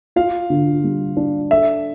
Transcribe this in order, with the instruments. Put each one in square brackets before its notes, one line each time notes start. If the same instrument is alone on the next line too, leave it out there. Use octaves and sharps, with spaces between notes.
[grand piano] F4 [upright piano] F5
[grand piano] D3
G3
D4
[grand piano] A4 [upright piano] E5